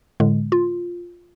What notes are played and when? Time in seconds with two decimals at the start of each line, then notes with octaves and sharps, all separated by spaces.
0.20 A2 D3 G#3
0.52 F4